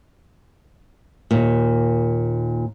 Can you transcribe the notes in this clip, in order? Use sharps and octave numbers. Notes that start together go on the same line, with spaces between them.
D#2 A#2